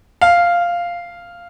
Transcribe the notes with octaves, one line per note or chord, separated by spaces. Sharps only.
F5